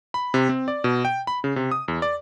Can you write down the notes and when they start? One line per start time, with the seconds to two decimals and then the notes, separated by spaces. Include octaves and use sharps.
0.14 B5
0.34 C3
0.49 C4
0.68 D5
0.84 B2
1.05 G5
1.27 B5
1.44 C#3
1.56 C3
1.71 D#6
1.88 E2
2.02 D5